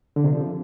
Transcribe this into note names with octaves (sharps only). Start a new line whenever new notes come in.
D3
C3
F3